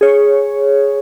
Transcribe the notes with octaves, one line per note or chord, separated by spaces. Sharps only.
G#4 C#5